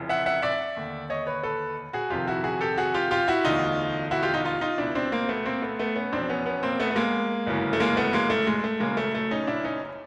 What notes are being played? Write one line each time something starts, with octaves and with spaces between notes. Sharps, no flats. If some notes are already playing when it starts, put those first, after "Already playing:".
Already playing: F1 F2 C#3 E3
E5 F#5
E5 F#5
D5 E5
D#2 D3
C#5 D#5
B4 C#5
A4 B4
F#4 G#4
F1 F2 C3 D#3 F4 G4
E4 F#4
F#4 G#4
G4 A4
F#4 G#4
F4 G4
F4 G4
E4 F#4
E1 D2 D3 D#4 F4
E4 F#4
F4 G4
D#4 F4
D#4 F4
D#4 F4
C#2 B2 D4 E4
C4 D4
A#3 C4
A3 B3
A#3 C4
A3 B3
A3 B3
B3 C#4
F1 E2 B2 C4 D4
B3 C#4
B3 C#4
A#3 C4
A3 B3
A3
G#3 A#3
G1 F#2 C#3 E3
A3
G#3 A#3
A3 B3
G#3 A#3
A3
G#3
A3
F#1 F#2 C#3 G#3 A#3
A3
A3
C#4 D#4
D4 E4
C#4 D#4